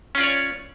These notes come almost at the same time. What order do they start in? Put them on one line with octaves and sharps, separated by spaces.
C#4 F4 D5 C#5